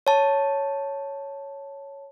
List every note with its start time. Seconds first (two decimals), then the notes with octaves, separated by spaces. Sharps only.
0.07 C#5 A5